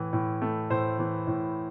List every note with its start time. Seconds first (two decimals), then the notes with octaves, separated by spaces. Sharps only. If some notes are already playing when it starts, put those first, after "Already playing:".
Already playing: A2 E3
0.13 A2
0.42 A3
0.70 A2 C5
0.99 E3
1.27 A2